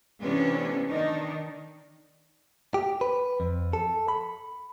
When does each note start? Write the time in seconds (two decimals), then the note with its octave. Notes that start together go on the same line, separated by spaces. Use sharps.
0.22 A2 C3 E3 B3 C#4 D4
0.87 D#3 D4 D#4
2.74 G4
3.01 B4
3.40 F2
3.73 A4
4.08 B5